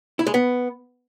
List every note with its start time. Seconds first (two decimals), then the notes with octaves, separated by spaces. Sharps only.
0.19 E4
0.27 G#3
0.34 B3